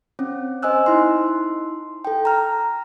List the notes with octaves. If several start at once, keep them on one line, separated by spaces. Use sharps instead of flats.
C4 C#4
C5 D#5 G#5 E6 F#6
D#4 E4 C6
A4 G5
A#5 F6